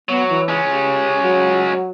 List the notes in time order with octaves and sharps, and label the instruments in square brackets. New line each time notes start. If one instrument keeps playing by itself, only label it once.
[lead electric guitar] F#3 [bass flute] B3
[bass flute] E3
[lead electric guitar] G#3 C#4
[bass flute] G4
F#3